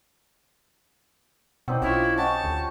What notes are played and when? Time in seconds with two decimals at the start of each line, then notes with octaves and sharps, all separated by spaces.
1.68 B2 C4 D#4 E4 C#5 D5 F#5
1.82 B1 C#4 D4 E4 F4 C#5 F5 A#5
1.97 D6
2.17 C#4 F#4 G4 C#5 D#5 F#5 A5
2.44 D2 F4